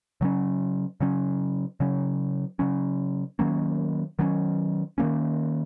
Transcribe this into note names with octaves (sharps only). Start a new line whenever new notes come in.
C#3 F#3 C#4
C#3 F#3 C#4
C#3 F#3 C#4
C#3 F#3 C#4
D#3 F#3 A#3 C#4
D#3 F#3 A#3 C#4
D#3 F#3 A#3 C#4